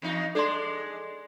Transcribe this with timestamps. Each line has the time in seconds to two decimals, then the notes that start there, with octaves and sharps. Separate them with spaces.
0.02 E2 D#4
0.35 G#3 D4 A4 D5 C6